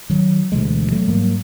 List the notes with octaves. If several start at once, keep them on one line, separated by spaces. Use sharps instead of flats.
D#3 F#3
D2 B2 E3 G#3
E3 F#3 A3
G#2 F#3 G3 A#3